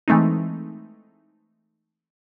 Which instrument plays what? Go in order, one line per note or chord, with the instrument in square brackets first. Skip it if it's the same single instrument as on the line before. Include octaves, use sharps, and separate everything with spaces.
[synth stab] E3 G#3 A3 C4 D#4